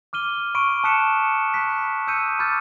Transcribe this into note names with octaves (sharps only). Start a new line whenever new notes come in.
D6 F6 D#7 G7
B5 C#6 D7 D#7
A5 D#6 F#6 B6 C#7 E7
B5 F#6 B6
D#6 E6 G6 C#7 D#7
B5 D6 E6 F6 G6 A6